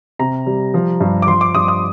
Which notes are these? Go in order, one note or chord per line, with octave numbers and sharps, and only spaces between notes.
C3 A#5
G3
F3
G2
D6
F3 C6
D6
G2 D#6
D#6